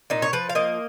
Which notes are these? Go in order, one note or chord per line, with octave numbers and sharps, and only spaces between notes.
A#2 D#4
C#5
F3 B4
F5
A#3 D#5